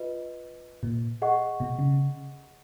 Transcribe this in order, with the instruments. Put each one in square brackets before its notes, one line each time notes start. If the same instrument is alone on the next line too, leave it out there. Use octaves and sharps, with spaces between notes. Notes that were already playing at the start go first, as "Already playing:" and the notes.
Already playing: [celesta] F4 B4 D#5
[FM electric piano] A#2
[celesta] G#4 D#5 F#5 C#6
[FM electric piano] B2
C#3